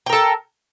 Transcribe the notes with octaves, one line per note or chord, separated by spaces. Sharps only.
A4 A#4 G5